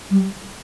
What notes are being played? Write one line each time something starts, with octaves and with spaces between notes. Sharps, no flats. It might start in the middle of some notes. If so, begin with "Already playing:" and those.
G3